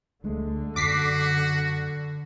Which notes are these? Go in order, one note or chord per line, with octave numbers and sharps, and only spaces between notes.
D2 D3 G#3 A3
F#2 F#4 D6 B6 C7